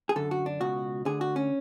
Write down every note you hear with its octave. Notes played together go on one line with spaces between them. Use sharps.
G#4
F#2 D3 A4
F#4
D4
C#2 B2 F#4
D2 D3 G#4
F#4
C#4